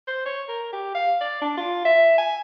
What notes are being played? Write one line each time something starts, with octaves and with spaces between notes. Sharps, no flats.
C5
C#5
A#4
G4
F5
D5
D4
F4
E5
G#5